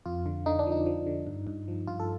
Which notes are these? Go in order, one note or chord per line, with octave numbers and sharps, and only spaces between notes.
F2 F4
D3
D3 D#4
D4
F3
D#4
F3
D3
G2
G2
F3
G2 F4
A4